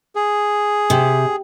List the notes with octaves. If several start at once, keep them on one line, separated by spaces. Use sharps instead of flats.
G#4
C3